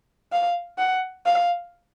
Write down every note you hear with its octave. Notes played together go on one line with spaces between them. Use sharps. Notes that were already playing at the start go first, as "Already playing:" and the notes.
F5
F#5
F5